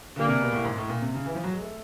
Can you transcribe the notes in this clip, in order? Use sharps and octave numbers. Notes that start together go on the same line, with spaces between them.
A#2 D3 G3 A#3
C3
B2
A2
G#2
A2
A#2
C3
C#3
E3
F3
F#3
G#3
A3